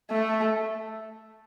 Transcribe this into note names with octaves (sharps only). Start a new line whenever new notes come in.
A3